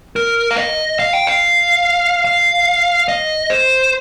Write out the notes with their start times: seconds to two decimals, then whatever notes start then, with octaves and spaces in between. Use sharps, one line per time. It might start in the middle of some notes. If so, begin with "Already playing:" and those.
0.16 A#4
0.51 F5
0.58 D#5
0.99 F5
1.13 G5
1.27 F5
2.25 F5
3.08 D#5
3.50 C5